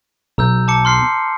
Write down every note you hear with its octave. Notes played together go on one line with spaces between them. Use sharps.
B1 A#5 E6 G6
A5 D6 C#7
C6 F6 C7